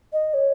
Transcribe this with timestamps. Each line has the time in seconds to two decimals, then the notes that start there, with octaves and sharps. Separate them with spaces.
0.13 D#5
0.34 C#5